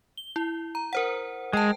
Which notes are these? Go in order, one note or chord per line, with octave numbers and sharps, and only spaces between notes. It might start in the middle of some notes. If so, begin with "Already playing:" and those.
G7
E4
A#5
A#4 C5 F#5
G#3 G5 A5